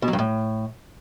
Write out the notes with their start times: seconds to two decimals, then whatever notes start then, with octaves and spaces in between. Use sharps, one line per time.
0.02 B2
0.08 F#3
0.13 G2
0.19 A2